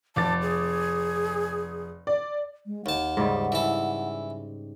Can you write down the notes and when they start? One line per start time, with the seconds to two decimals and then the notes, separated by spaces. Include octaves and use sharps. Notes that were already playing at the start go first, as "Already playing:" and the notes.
0.16 F1 A5 D6 A6
0.42 G#4
2.07 D5
2.66 G#3
2.86 D#2 F#5 A5
3.17 G#2 C#3 G3
3.52 E3 A4